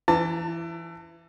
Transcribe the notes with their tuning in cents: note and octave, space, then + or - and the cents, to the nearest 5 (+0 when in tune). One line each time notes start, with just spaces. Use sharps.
E3 +20 A5 +30